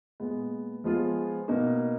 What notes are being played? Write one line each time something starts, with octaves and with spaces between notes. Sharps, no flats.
A#2 G#3 B3
F3 G#3 B3 F4 G#4
B2 A#3 D#4